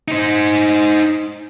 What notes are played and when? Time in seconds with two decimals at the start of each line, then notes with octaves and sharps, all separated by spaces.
0.08 D#4 C5